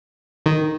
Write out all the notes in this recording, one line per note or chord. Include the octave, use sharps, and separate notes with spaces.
D#3